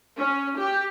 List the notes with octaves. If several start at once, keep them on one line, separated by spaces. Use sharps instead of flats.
C#4
G4